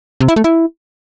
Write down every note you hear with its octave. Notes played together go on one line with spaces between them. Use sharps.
C3
E4
A3
E4